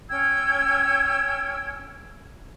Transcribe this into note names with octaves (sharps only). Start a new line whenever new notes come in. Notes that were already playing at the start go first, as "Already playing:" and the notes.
C#4 G5 E6 G#6